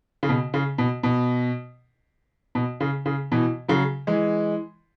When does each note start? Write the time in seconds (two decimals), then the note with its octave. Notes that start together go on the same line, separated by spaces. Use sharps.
0.23 C#3
0.29 B2
0.54 C#3
0.78 B2
1.03 B2
2.55 B2
2.80 C#3
3.06 C#3
3.32 B2 E3
3.68 C#3 F#3
4.07 E3 G#3